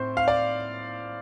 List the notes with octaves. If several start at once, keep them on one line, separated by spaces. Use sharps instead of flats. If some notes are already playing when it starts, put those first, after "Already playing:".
Already playing: A2 C4 C5
F5
D5